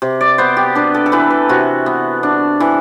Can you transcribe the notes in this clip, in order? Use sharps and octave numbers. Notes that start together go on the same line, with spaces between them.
C3
D5
B3 C5
G4
D4 B4
A4
A4
E3 B4
B4
C3 F#4
B3
D4
E3